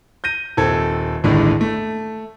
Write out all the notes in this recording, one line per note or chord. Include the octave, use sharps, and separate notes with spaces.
G6 A#6 D#7
D#1 C4 A4 G#6
A1 D#2 A2 D3 G#3 D4
A3